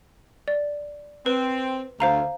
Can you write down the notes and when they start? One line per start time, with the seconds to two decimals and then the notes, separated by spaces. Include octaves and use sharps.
0.48 D5
1.26 C4 B4
2.00 D2 C5 F5 A#5